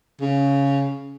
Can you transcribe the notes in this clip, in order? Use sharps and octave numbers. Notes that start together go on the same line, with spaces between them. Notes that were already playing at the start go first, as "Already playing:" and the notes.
C#3